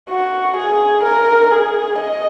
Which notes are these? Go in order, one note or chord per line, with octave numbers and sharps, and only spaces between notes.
F#4
G#4
A#4
G#4
D#5